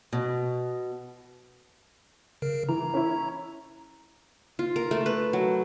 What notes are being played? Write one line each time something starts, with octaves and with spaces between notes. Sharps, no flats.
B2
C#3 A#4
E3 A#5
C#4 E4
F4
A#4
A3
B4
F#3